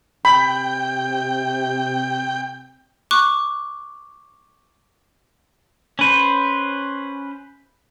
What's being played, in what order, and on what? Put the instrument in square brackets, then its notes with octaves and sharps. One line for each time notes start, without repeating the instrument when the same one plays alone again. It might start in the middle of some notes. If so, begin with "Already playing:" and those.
[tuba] C3 [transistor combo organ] G5 [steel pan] B5
[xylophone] C#6 D6 F#6
[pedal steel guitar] C#4 B4 C5